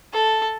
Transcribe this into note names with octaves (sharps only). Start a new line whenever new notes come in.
A4